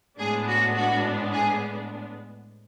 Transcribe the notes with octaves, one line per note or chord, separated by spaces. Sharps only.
A2 G#3 B3 D4 G#4
F#4
F#4
G#4